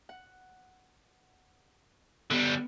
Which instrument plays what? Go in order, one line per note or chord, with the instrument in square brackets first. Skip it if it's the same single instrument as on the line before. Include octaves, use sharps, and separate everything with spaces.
[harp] F#5
[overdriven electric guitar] D3 G3 [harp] B3